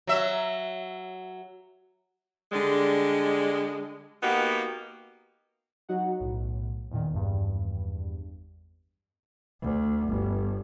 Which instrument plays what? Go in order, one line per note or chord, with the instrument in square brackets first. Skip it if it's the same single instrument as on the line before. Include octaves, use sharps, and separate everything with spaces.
[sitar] F#3 E5
[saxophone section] D3 G3 G#3
A#3 B3 D#4 F#4 G4
[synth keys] F#3 D#4 F#4 F#5
B1 A2
E2 A#2 D#3
G#1 E2 G2
[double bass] D2
G1